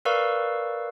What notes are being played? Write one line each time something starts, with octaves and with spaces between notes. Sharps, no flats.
A#4 B4 D5 F5 C#6 E6